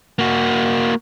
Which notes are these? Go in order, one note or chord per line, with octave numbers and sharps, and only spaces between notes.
A#3 F#4